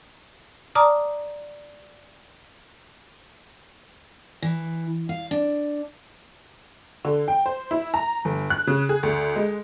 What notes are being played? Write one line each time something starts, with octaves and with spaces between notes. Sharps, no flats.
D5 A5 A#5 D6 D#6 F6
E3
F5
D4
D3
G5
C5
E4
A#5
G1
F#6
C#3
G#4
D2
G#3